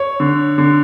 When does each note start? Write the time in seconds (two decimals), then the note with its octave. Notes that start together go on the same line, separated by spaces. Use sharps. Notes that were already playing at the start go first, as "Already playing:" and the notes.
Already playing: C#5
0.20 D3
0.58 D3